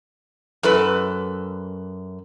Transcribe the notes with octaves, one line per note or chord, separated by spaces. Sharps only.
F#2 A4 B4